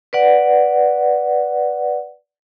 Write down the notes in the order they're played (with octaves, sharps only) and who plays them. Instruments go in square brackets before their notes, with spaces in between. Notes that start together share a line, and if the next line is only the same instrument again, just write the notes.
[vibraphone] B4 D5 F#5